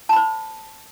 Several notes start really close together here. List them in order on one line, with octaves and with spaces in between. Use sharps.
A5 B5 C5